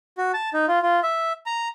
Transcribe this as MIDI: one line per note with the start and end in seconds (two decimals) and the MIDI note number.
0.18 0.32 66
0.34 0.50 81
0.54 0.66 63
0.68 0.79 65
0.82 1.00 65
1.03 1.33 76
1.46 1.68 82